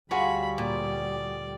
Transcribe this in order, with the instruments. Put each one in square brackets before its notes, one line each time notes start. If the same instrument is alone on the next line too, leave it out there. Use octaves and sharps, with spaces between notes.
[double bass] D2 G3 [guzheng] F4 [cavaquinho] F#4 G#4 C#5 [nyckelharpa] B5
[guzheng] A#2 [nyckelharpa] D5